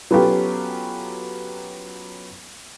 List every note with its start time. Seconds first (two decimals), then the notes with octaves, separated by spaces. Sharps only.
0.11 F#3 B3 C#4 F4 G4 A4